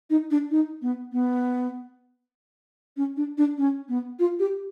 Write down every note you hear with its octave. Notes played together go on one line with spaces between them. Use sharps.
D#4
D4
D#4
B3
B3
C#4
D4
D4
C#4
B3
F4
G4